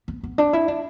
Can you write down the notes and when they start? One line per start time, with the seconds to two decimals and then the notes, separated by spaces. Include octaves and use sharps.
0.08 B3
0.23 B3
0.38 D4
0.53 E4
0.68 D4